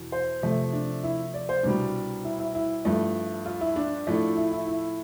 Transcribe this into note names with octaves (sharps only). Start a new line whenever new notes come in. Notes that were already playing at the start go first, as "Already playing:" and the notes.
Already playing: E2 B2
C5
F2 C3 F3 A3
D4
E4
D5
C5
C2 B2 G3 D4
E4
E4
E4
G2 F3 A3
F4
E4
D4
A2 F3 A3
E4
E4
E4